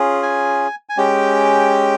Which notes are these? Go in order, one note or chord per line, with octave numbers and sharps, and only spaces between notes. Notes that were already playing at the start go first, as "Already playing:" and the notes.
Already playing: C#4 F4 G#4
G#5
G#5
G#3 C#4 G4 G5